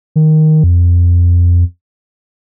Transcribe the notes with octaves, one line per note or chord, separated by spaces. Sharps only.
D#3
F2